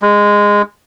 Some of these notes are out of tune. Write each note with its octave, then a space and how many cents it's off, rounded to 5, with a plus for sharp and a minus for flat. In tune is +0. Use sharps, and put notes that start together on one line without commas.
G#3 -15